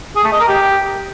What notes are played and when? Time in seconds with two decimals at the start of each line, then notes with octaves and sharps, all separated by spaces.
0.16 G#4
0.24 A3
0.32 D#5
0.40 A#4
0.48 G4